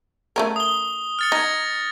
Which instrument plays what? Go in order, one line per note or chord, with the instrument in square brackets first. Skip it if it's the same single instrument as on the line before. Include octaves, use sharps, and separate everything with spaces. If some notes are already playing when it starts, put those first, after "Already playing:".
[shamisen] A3 C#4 A#4
[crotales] D#6 G7
F6 A6 C#7
[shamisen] D#4 [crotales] G#6 A#6